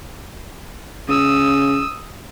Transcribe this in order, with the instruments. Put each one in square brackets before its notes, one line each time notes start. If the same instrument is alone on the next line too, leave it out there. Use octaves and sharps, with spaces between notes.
[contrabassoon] C#3 [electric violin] D#6 E6